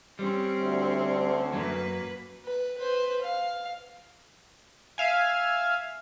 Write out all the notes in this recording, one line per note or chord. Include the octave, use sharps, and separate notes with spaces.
G3 C4 C#4
D2
F#2 F#3 A#3 B4
B4
B4 C5
F5
E5 F5 G#5